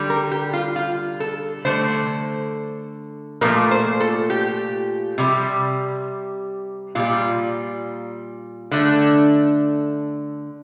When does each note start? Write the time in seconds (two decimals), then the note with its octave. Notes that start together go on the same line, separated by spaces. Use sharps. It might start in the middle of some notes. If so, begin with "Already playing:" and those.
Already playing: D3 G3
0.10 A#4
0.31 G4
0.53 F4
0.76 F4
1.20 A4
1.65 D3 A3 C5
3.41 A#2 F3 A3 A#4
3.71 C5
4.00 A4
4.30 G4
5.18 C3 G3
6.95 A#2 G3 F4
8.71 D3 A3 D4